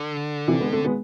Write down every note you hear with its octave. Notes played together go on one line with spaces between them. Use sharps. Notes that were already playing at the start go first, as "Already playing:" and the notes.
Already playing: D3
C3 E3
G#3 B3
A3 C4
G#3 B3